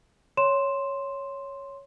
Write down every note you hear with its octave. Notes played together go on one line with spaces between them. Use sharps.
C#5 C6 E7